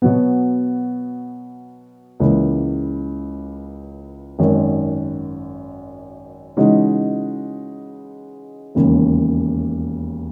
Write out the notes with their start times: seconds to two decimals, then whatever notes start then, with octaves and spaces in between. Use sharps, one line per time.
0.02 B2 F#3 B3
2.20 C#2 C#3 E3 A#3
4.39 G#1 F#2 D#3
6.57 C#3 E3 G#3 D#4 F#4
8.75 E1 D#2 C#3